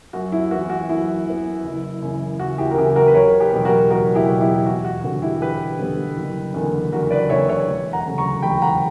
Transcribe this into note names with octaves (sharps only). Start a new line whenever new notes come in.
F#2 F#4
E4
E3 B3 F#4
F#4
F#2 E4
E3 B3
F#1
F#2 C#3 E3
F#1 F#4
E4 G4
A#4
F#2 C#3 E3 E4 G4
F#4 A#4
B4
F#1 A#4 C#5
G4 B4
E2 B2 F#3 B3
F#4 A#4
F#1 F#4 A#4
E4 G4
E2 B2 F#3 B3
E4 G4
E2 F#4
F#4
D3 G3 B3 F#4
E4 G4
E2 G4 B4
D3 G3 B3
F#1
E2 D3 A#3
F#1 F#4 A#4
B4 D5
E2 D3 A#3 C#5 E5
C#5 E5
E1
F#5 A#5
D2 C#3 F#3
A#5 C#6
E1 G5 B5
F#5 A#5